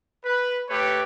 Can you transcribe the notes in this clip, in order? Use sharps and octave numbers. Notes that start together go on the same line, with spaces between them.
B4
A3 G4 B4 C#5